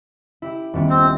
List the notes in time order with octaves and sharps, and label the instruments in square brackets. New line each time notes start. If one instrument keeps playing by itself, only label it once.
[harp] E4 G4
D#1 G3 B3
[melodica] C4